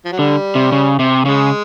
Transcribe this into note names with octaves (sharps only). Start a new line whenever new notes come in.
F3
F#3
D3 G3
C3
C#3
C3
C#3 G#3